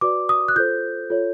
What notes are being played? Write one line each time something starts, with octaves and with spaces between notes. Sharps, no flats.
F#4 B4 D5 D6
D#6
F#6
F4 A4 C5 G6
F4 A4 C#5